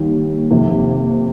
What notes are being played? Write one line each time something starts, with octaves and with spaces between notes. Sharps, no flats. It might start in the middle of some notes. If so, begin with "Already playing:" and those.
Already playing: D#2 D#3 G3 A#3
F2 C3 D#3 A#3